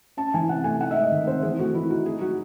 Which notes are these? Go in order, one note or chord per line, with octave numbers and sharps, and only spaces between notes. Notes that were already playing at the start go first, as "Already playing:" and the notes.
C#4 A5
E3 G#5
C3 F#5
A3 G#5
D#4 F#5
G#3 E5
D#5
D#3 D#5
C4 C5
E3 G#4
A3 F#4
E3 E4
D#4 F#4
D#4 G#4
F#3 F#4